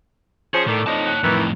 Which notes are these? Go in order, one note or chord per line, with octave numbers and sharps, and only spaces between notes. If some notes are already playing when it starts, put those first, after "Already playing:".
F3 C#4 G#4 C5 C#6
A2 D#3 A3 D5
F2 D#4 C#5 A5
F#5
F2 A2 D#3 E3